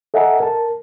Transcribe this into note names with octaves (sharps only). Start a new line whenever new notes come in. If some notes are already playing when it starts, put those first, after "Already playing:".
A4 D#5 E5 F#5 G#5 A#5
A#4 A5